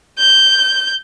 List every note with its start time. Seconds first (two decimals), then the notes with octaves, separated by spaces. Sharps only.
0.19 G6